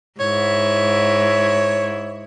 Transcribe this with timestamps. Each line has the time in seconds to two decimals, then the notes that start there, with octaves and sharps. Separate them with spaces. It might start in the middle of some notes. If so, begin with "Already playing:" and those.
0.20 G#2 E4 C#5